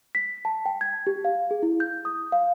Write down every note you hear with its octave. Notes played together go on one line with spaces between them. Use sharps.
B6
A5
G5
G#6
G4
F5
G#4
E4
G6
D#6
F5